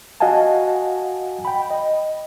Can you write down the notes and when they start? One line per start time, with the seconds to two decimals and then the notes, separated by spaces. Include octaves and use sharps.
0.20 F#4 D#5 F5 F#5 G#5 A5
1.45 G5 B5
1.71 D#5